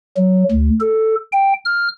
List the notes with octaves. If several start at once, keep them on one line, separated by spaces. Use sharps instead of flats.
F#3
D2
A4
G5
F6